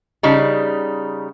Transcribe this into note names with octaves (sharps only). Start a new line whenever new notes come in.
C#3 G3 D#4